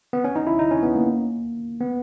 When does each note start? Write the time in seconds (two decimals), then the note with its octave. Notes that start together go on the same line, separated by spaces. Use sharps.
0.13 B3
0.24 C#4
0.36 D#4
0.47 E4
0.59 D#4
0.71 C#4
0.83 B3
0.96 A#3
1.81 B3